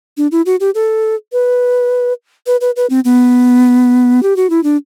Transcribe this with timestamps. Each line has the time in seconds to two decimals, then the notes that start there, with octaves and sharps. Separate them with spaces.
0.17 D4
0.31 E4
0.46 F#4
0.60 G4
0.75 A4
1.32 B4
2.46 B4
2.61 B4
2.76 B4
2.90 C4
3.04 B3
4.23 G4
4.36 F#4
4.50 E4
4.63 D4